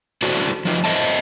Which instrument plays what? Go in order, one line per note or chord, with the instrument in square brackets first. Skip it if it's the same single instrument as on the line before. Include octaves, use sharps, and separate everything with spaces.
[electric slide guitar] A3 D4 E4 F#4 A4 C5
F3 D#4
A4 A#4 C5 D#5 E5 A5